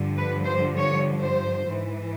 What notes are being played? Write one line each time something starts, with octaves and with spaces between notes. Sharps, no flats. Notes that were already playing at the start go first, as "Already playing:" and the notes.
Already playing: G2 D3 F3
B4
C5
C#5
C5
G#2 E3